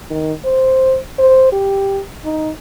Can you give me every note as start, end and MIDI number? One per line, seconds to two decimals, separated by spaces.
0.10 0.33 51
0.45 0.98 72
1.18 1.48 72
1.52 2.01 67
2.25 2.50 63